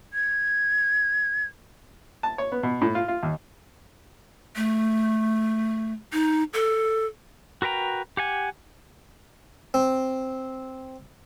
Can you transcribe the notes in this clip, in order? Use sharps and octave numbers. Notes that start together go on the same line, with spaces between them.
G#6
A5
C#5
B3
B2
A2
F4
F4
D#2
A3
D#4
A4
F#4 A#4 B4 G5 A#5
G4 F#5 G#5
C4